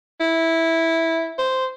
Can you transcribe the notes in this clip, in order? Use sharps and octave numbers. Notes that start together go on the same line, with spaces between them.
E4
C5